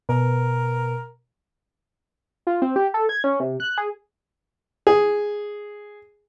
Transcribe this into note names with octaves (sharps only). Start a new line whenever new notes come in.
B2 A#4
F4
C4
G4
A4
G#6
C#4
C3
F#6
G#4
G#4